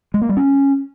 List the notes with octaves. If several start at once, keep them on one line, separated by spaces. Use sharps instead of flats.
G#3
A#3
G3
C#4